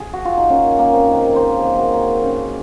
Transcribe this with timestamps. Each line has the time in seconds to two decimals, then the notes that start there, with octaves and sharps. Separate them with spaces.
0.00 G#4
0.13 F#4
0.25 F4
0.37 D#4
0.50 A#3 C#4
0.79 A#3
0.93 C4
1.08 D#3
1.14 A#4
1.36 D#3 C5
1.57 G#4
1.65 A#3
1.79 F#4
1.94 A#3
2.01 G#4
2.22 C#3